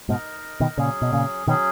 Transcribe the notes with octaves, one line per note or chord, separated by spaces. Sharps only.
G#2 B2 D#4 A#4 D#5
B2 D#3
A#2 C#3 F#3 C#4 G#4
B2
A#2 C#3
B2 D#3 F#3 C#4 G#4